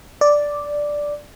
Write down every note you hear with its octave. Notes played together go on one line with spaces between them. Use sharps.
D5